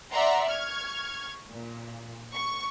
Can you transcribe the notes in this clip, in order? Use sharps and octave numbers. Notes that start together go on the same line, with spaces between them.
D5 E5 F#5 A#5 C6
C#6 F6 G#6
A#2
C#6